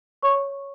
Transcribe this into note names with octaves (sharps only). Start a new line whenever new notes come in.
C#5 C#6